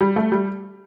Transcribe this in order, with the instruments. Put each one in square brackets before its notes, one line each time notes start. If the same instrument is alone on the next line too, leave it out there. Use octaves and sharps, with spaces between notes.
[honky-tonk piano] G3
A3
G3